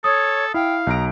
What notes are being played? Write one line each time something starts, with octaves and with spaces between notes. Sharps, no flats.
A4 C#5 D#6
E4 F5 G5
B1 A#5 D7